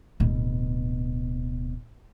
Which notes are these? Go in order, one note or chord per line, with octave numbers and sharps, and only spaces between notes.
D1 B2